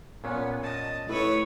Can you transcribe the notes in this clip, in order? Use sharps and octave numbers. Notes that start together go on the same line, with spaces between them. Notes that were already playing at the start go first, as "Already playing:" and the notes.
A#2 B3 C#4
D#5 A5
A2 B4 C#5 E6